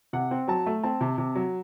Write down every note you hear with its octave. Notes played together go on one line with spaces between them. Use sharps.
C3 F#5
C4
F#3 A5
A3
C4 A5
C3
C3
F#3